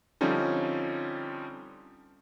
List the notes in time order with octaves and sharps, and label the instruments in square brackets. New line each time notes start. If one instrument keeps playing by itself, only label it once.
[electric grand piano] D3 F3 G3 C4 C#4 D#4